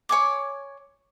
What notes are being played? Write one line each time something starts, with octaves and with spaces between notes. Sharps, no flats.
C#5 G#5 D6